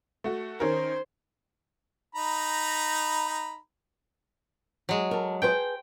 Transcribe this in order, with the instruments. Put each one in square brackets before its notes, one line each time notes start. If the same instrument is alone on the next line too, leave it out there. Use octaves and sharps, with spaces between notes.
[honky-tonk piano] A3 F#4
[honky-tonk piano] D#3 C#4 A#4 [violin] C5
[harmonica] D#4 A#5 B5
[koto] F#3 G#3
[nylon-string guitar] A4 A#4
[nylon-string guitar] G#4 B4 C5 [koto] G5